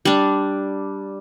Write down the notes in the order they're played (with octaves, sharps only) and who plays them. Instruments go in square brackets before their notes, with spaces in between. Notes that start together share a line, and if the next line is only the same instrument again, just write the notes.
[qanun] G3 D4